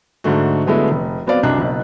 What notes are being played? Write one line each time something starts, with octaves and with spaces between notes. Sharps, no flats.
G#2 D3 A3 F#4
D3 F#3 G#3 A3 B3 E4
F1
F#3 B3 C4 D5 F5
C2 F#2 D4 D#5 A#5 F#6
F#1 B1